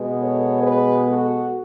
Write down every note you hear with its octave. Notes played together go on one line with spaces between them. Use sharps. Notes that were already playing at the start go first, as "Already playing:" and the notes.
Already playing: B2 G#3 B3
A4 C#5
G#4 B4
F#4 A4